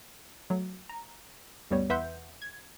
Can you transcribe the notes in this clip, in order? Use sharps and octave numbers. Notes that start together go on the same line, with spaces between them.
F#3 A3
A#5
D2 G2 G3 B3 C#5
E2 B4 E5 F#5 C6 G6
G#6